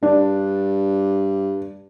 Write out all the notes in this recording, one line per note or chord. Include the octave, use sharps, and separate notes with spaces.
G2 D4